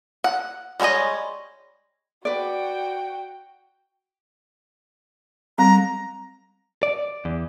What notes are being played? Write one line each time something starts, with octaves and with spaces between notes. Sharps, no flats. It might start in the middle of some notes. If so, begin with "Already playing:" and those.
F#5
G3 G#3 F#4 C#5 D#5
F#4 B4 D5 G5
G3 C4 A#5
D5
E2